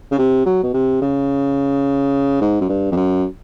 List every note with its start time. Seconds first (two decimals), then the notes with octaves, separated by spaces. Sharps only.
0.11 C#3
0.18 C3
0.46 F#3
0.63 B2
0.74 C3
1.02 C#3
2.41 G#2
2.61 F#2
2.69 G2
2.92 F2
2.96 F#2